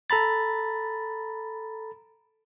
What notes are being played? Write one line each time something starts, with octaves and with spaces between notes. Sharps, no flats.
A4 A#5 B5 A6